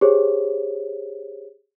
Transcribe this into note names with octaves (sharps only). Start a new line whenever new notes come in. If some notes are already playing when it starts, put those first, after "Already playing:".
G4 G#4 C5 C#5